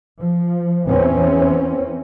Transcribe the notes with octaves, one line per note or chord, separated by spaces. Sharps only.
F3
E2 E3 C4 C#4